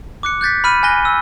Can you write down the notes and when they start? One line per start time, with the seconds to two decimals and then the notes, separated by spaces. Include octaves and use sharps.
0.23 D6 F#6 C#7
0.41 F#6 G6 A6 B6
0.64 B5 F6 D#7
0.83 G#5 F#6 A#6 G7
1.05 E6